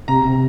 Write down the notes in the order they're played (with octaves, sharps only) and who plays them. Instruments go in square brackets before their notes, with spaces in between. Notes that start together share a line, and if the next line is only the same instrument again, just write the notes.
[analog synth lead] C3 [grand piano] A#5
[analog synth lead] C3